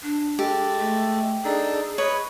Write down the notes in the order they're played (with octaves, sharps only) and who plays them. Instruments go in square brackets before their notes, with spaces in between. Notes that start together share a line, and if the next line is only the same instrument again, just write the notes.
[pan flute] D4
[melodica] G#3 A4 [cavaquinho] G4
[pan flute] A3
[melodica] D4 D#4 A4 [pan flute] G#4
[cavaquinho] B4 [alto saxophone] C#5 [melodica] D#5